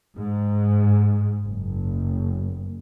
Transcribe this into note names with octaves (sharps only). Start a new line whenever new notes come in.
G#2
F#1